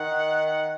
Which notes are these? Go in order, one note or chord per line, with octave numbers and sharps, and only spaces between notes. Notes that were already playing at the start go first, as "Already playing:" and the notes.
Already playing: D#3 F#5